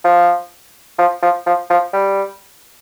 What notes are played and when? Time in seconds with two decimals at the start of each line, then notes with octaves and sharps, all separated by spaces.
0.04 F3
0.99 F3
1.22 F3
1.46 F3
1.70 F3
1.94 G3